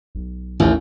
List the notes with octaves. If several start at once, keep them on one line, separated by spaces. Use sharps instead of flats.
B1
A1 D#2